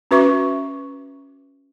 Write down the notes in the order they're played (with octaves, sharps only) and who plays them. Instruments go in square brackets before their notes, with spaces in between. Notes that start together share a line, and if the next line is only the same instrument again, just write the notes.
[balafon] C#4 F#4 B4 E5 C#6 D6